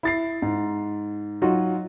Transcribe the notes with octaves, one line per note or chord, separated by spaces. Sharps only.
E4 A6 C7
G#2
F#3 D#4 F4 F#4